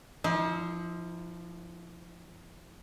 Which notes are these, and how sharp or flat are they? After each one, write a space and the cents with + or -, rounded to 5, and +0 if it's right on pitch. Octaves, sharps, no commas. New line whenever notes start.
F3 -15 D#4 +45